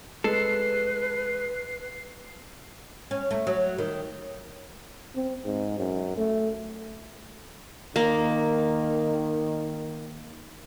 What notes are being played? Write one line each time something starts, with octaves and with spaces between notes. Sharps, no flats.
G#3 A4 B4 C7
C#4
A3
F#3
D#3
C4
G#2
F#2
A3
D#3 A#3